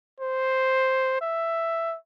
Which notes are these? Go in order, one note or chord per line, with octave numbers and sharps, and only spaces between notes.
C5
E5